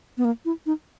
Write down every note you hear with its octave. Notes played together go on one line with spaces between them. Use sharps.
B3
A#3
E4
D#4